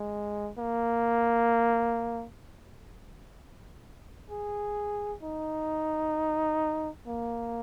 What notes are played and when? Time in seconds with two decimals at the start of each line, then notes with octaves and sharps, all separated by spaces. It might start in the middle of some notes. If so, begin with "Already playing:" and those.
Already playing: G#3
0.58 A#3
4.30 G#4
5.23 D#4
7.07 A#3